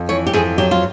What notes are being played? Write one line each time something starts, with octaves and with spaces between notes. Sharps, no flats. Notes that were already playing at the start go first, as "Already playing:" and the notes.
Already playing: F2
E3 C#5
G4
F2 G#4
F#3 G4
F4